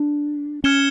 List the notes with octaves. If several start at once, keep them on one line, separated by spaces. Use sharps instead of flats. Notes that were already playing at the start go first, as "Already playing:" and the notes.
Already playing: D4
C#4 F6 G#6 C#7 E7 G7